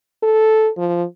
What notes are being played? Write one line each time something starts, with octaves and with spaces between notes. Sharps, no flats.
A4
F3